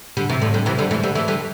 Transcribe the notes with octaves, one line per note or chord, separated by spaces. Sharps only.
D3 G3
C3 E3
A2 D3
D3 G3
C3 E3
D3 G3
E3 A3
D3 G3
E3 A3
D3 G3